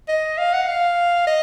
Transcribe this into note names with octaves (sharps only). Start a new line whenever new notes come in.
D#5
F5
F#5
F5
D#5